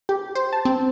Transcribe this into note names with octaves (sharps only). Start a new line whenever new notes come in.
G4
C5
A5
C4